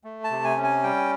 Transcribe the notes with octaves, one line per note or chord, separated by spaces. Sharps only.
A3
A5
C3
G#5
C#4
G#5
G3 G5